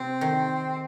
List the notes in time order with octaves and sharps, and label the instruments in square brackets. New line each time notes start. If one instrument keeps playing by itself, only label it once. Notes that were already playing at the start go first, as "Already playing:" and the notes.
Already playing: [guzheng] C3 [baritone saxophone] C4
[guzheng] D#3